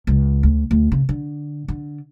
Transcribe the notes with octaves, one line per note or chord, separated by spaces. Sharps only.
C#2
D2
D2
C#3
D3
D3